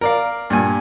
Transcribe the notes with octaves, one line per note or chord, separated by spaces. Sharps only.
A#4 D5 F5
G2 A#2 G#5